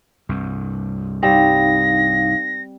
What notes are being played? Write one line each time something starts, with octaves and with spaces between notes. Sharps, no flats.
C2 G2
G3 C4 D#4 F5 A#6